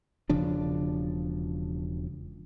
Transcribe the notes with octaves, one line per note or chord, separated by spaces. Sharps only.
E1 C#3 F3 D4